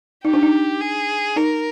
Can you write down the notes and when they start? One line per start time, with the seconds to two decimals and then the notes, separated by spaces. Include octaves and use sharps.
0.25 D#4 G4
0.33 D4
0.43 D#4
0.81 G#4
1.36 D#4 A#4